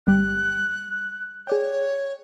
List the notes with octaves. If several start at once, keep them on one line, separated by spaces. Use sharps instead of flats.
G1 G3 G4 F#6
G#4 C#5 D5 G5